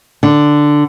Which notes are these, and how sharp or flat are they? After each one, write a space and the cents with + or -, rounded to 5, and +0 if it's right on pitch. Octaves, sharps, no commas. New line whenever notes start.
D3 +5